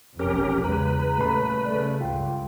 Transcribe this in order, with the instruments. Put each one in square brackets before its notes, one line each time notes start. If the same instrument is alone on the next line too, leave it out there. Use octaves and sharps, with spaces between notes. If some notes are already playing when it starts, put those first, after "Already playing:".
[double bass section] F1 B1 F2 [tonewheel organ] C#4 G4 A#4
[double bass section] E2 C#3 G#3 [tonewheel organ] B4 [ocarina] A#5
[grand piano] D#1 B5 [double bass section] C#3 A3
[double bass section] C#3 A3 [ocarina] D5
[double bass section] C#2 G2 [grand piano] F4 [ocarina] G5